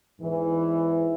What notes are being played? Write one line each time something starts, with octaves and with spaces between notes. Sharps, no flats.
E2 G#2 E3